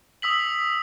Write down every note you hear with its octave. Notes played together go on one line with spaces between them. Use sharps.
D#6 E6 B6 F#7